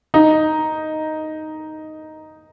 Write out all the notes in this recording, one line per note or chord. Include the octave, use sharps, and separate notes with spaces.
D#4